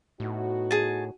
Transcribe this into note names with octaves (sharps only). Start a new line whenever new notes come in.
A2 B3 D#4 F#4
G#4 A5